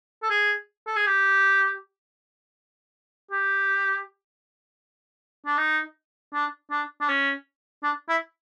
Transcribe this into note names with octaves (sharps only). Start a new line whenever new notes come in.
A4
G#4
A4
G#4
G4
G4
D4
D#4
D4
D4
D4
C#4
D4
E4